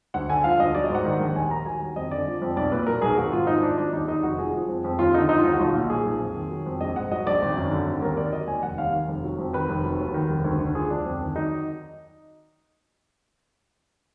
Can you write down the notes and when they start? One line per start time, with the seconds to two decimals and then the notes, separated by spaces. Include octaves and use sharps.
0.14 D2 F#5
0.29 D3 G#5
0.44 F3 F5
0.60 D2 D#5
0.75 F#3 D5
0.85 D#5
0.90 G#2 F#5
1.05 D#3
1.20 A#1
1.35 D#2 G#5
1.51 D#3 A#5
1.66 F#3 G#5
1.81 D#2
1.96 F2 D#5
2.11 D3 D5
2.26 F3
2.42 F2
2.56 B1 D5
2.72 A#2 B4
2.87 F#3 A#4
3.02 B1 G#4
3.17 G#1 F#4
3.32 G#2 F4
3.47 F3 D#4
3.62 G#1 D4
3.78 F#3 D4
3.93 D#2 D#4
4.08 D#3 D#4
4.23 F1 F#4
4.38 F3 G#4
4.53 F3
4.68 F2
4.84 F2
4.99 D#2 F4
5.14 D3 D#4
5.29 F3 D#4
5.39 F4
5.44 D#2 D#4
5.53 F#4
5.60 B1 F4
5.75 A#2
5.90 F3 G#4
6.05 B1
6.20 F2
6.35 D#3
6.50 F#3
6.66 F2
6.81 A#1 D#5
6.96 G#2 F#5
7.12 F#3 D#5
7.26 A#1 D5
7.42 G#1
7.57 F#2
7.71 D3
7.87 G#1
8.02 D#2 A#4
8.17 D#3 D5
8.32 F#3 D#5
8.47 D#2 G#5
8.63 F1 F#5
8.78 D#2 F5
8.94 D#3
9.08 F1
9.24 F#3
9.39 F2
9.53 D#3 B4
9.69 F1
9.84 F#3
9.99 D#2
10.14 D#3
10.30 F1
10.44 D2
10.60 D3
10.74 F3 G#4
10.90 D2 D4
11.05 F2
11.21 D#3
11.35 F#3 D#4